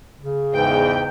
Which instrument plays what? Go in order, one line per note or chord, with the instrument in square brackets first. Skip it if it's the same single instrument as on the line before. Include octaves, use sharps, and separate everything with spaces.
[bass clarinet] C#3
[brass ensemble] E2 G#2 [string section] G5